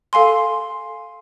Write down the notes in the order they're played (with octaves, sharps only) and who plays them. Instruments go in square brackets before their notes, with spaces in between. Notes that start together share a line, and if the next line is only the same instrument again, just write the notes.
[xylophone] A4 F5 G#5 C6